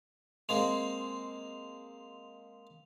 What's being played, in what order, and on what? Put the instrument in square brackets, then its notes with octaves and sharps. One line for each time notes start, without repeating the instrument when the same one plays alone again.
[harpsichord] G#3 A#3 C4 [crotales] F7